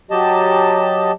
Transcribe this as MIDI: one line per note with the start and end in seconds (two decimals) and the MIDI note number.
0.11 1.11 54
0.11 1.11 67
0.11 1.11 75
0.11 1.11 81